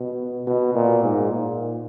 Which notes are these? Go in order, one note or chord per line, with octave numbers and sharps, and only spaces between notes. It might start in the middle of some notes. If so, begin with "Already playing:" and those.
Already playing: B2
B2
A#2
G#2
A#2